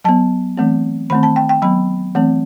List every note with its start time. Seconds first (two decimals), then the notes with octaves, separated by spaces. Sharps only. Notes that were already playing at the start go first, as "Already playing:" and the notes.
0.04 F#3 B3 A5
0.57 E3 A3 C4
1.10 D#3 A3 C4 B5
1.23 A5
1.36 G5
1.49 G5
1.62 F#3 B3 B5
2.15 E3 A3 C4